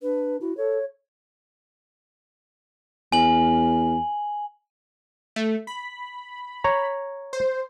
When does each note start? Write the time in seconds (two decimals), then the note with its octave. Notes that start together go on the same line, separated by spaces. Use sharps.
0.02 D4 B4
0.41 E4 F#4
0.57 A4 C#5
3.12 E2 G#5 F#7
5.36 A3
5.67 B5
6.64 C#5 A#5
7.33 C5